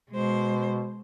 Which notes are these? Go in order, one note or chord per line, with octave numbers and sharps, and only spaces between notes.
B2 G#3 C5